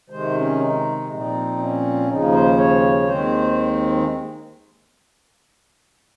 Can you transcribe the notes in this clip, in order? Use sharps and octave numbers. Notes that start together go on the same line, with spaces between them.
C3 D#3 G#3 C5
C#4
D#4
A#2 F3 C4 D#4
C#4
D#2 C#3 F3 D#4
C5
C#5
D#2 D#3 G#3 C4 C5